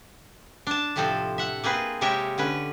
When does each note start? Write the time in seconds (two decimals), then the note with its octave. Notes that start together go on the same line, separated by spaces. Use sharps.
0.67 D4 A5
0.96 A2 C3 F3 C4 A4
1.38 E5 F#5
1.64 A#3 C4 G#4 B4
2.01 C3 G#3 G4 A#4 C#5 E5
2.38 D3 C#4 B4